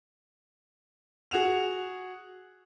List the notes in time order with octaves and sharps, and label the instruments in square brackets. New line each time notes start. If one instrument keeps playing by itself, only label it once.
[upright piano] F#4 G#4 F#5 E7 F7